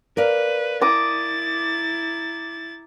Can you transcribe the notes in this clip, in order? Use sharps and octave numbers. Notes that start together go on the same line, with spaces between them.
A#4 B4 D5 F5
E4 A#5 D6 D#6 A6